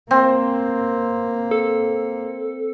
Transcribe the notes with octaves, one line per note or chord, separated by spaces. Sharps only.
A#3 C4
A4